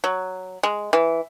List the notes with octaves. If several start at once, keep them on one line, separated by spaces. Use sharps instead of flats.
F#3
G#3
E3